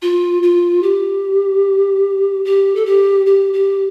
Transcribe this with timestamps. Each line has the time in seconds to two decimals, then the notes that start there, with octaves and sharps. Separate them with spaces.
0.02 F4
0.43 F4
0.83 G4
2.45 G4
2.75 A4
2.86 G4
3.26 G4
3.53 G4